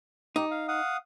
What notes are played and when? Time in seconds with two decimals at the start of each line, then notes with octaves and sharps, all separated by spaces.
0.36 D#4 G4
0.51 F5
0.68 F5 F#5 D#6